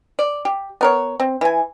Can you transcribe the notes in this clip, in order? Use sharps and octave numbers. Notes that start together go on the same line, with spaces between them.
D5
G4
B3 A#4 C#5
C4
E3 G#5